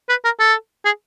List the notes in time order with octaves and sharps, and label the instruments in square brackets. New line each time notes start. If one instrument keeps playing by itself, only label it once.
[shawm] B4
A#4
A4
G#4